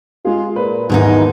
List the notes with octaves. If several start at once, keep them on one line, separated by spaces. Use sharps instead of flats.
G#3 F4 G#4
A#2 B4
D#2 G#2 E3 G#3 B3 D#4